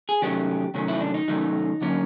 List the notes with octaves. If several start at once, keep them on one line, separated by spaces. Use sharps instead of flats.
G#4
C3 D#3 F#3 A3 C#4 G4
C3 D#3 F#3 A3 C#4
E4
D4
D#4
C3 D#3 F#3 A3 C#4
D3 F#3 A#3 C#4